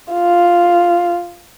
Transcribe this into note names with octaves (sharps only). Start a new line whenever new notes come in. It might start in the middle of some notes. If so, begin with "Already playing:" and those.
F4